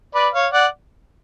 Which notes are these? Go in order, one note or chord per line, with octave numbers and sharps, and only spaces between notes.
B4 D5
C#5 F5
D5 F#5